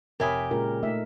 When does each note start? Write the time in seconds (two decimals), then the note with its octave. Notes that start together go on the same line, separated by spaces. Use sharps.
0.20 F1 G4 A#4 C#5 E5 G#5 B5 D#6
0.51 A#2 C#3 G#3 F4 A#4
0.83 A#2 A3 D#4 E5